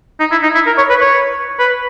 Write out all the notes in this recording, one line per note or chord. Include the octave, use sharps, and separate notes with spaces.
D#4
E4
D#4
E4
A#4
C#5
B4
C#5
B4